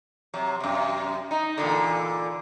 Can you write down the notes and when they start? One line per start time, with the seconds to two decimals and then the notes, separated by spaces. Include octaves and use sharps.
0.34 C3 F#3
0.60 F#2 C3
1.31 D#4
1.57 E2 A#2 D3